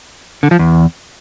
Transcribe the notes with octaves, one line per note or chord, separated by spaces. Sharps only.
D3
F3
E2